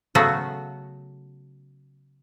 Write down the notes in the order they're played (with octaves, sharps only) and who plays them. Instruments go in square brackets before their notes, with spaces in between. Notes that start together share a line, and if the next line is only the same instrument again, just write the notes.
[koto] C#3 F#3 A3 B3 C#4 F#4